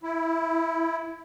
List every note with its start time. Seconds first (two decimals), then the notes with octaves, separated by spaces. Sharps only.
0.03 E4